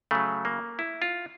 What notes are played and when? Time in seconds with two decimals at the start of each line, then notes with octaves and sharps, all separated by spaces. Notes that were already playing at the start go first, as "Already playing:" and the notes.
0.11 C#3 F#3 A3
0.45 A#3
0.79 E4
1.02 F4